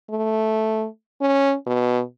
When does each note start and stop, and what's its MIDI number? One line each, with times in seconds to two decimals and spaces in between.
0.10 0.86 57
1.21 1.54 61
1.67 2.01 47